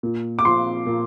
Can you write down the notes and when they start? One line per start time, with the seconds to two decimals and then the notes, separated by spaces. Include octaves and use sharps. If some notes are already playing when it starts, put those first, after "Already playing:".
0.03 A#2
0.39 D6
0.45 F3 C6
0.87 A#2